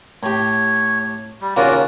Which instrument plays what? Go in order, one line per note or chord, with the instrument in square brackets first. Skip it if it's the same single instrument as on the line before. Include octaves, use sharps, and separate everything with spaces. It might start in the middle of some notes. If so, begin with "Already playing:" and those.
[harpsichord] A2 G4 [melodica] C#5
[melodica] G3
[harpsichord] D#2 C#3 A#3 [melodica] F4 F#4 D5